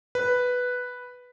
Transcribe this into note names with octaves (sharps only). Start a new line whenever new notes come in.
B4